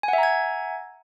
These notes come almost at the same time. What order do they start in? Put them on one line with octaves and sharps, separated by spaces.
G#5 F#5 E5 A#5 G#6